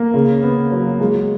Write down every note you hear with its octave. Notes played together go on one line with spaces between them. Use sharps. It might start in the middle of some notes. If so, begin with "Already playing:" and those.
Already playing: A#3
C#3
B3
F#3
G#3